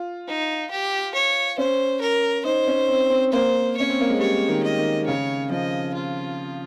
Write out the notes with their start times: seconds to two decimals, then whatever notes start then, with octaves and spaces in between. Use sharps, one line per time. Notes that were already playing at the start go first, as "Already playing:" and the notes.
Already playing: F4
0.28 D#4
0.71 G4
1.14 C#5
1.58 C#4 C5
2.01 A#4
2.45 D#4 C5
2.68 C#4
2.88 C4
3.10 C4
3.32 A#3 C5
3.77 C#4 C#5
3.90 C4
4.01 A#3
4.10 G#3
4.19 G3 C#5
4.48 D#3
4.63 D#5
4.78 D#3
5.07 C#3 C#5
5.50 F3 D#5
5.94 F4